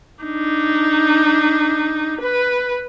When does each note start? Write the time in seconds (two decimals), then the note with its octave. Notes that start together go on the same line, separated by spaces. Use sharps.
0.24 D4 D#4
2.21 B4